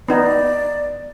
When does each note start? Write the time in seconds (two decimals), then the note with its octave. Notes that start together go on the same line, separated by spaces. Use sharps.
0.08 B3 D#4 D5